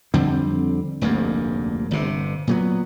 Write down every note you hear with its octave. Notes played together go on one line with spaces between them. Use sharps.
F2 D3 G3 C4
F1 D2 G2 A#3
G1 C3
A#2 F#3 B3